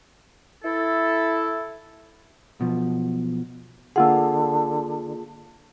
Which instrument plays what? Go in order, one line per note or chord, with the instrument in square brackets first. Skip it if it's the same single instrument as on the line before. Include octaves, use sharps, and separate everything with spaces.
[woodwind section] E4 A4
[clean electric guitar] B1 B2 F3
[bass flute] D3 [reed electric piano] A#3 F4 G#4 [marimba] F#5 E6